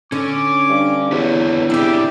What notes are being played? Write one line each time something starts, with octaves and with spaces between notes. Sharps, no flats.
D3 C#4 D6
G2
E2 D3 B4 C#5
C4 D4 E4 G4 G#4 D5